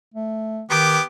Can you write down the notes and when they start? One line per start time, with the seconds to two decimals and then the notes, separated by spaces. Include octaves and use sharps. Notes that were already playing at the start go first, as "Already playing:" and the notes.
0.14 A3
0.70 D#3 B3 G4 D6